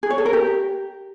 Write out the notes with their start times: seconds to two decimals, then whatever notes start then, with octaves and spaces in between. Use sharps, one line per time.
0.03 G#4
0.10 C#5
0.18 A4
0.26 A#4
0.33 G4